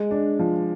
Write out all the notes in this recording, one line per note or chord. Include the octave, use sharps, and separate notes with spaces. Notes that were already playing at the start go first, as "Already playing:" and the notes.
Already playing: G#3
D4
F3